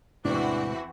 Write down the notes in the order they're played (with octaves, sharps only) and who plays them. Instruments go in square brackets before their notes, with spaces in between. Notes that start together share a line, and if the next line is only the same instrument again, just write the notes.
[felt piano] E2 [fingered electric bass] A2 C3 G#3 [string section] E3 C4 F#4 [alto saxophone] D4